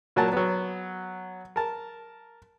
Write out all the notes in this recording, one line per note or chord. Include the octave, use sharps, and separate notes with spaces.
A#2 F#3 F#4 A#4 A5
F#3 B3
A#4 A5